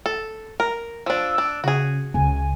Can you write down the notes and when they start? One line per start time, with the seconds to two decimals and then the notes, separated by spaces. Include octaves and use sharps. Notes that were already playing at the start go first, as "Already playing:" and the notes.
0.06 A4
0.60 A#4
1.06 F3 D4 E6
1.38 D4
1.64 C#3 F#4 G#4
2.14 C#2 C#3 G#5